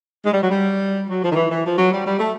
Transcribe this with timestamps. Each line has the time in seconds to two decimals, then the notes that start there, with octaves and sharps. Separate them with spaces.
0.24 G#3
0.33 G3
0.41 F#3
0.49 G3
1.08 F#3
1.21 F3
1.30 D#3
1.35 E3
1.49 E3
1.64 F3
1.77 F#3
1.91 G3
2.04 G3
2.18 A3